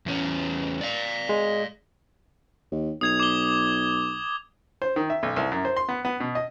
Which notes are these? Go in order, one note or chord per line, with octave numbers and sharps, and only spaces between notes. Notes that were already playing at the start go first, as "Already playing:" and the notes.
E2 C#4
D5 F5
G#3
D#2
B1 D#6 G#6 F7
D6 G7
C5
D#3
E5
B1
C2
F#2
C5
C6
B3
B3
B2
D#5